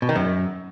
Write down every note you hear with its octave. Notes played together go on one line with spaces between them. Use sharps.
B2
D#3
F#2